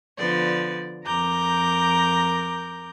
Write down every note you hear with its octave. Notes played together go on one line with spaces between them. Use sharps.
D3 F3 B3 D5
F2 A#4 A#5 D6 G6